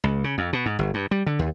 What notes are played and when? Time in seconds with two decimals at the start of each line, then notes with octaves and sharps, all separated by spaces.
0.04 C#2
0.24 C#3
0.38 F2
0.53 B2
0.66 G#2
0.79 G1
0.94 G2
1.11 G3
1.27 D3
1.39 D#2